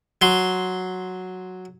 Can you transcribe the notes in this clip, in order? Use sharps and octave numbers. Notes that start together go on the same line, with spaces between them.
F#3 C6